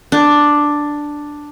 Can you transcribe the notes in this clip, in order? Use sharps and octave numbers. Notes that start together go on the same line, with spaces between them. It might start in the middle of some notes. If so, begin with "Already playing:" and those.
D4